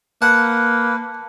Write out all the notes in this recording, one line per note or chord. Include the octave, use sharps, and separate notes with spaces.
A#3 B4 F#5 A5 C#7